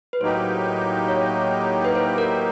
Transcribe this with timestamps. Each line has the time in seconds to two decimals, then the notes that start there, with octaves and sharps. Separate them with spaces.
0.13 B4
0.20 A2 F#3 A#3 D#4 G4 C5
1.08 C#5
1.84 B4
1.95 C5
2.18 A#4